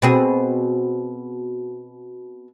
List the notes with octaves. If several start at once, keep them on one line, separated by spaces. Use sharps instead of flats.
B2 C4 G#4